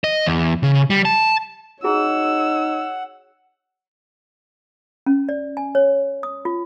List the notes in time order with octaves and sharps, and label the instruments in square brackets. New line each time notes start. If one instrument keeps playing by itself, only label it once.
[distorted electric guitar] D#5
E2
C#3
G3
A5
[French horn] D#4 [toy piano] F#4 G#4 A#5 [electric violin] C#5 E6 [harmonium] F#5
[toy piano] C#4
D5
G#5
C#5
D#6
F4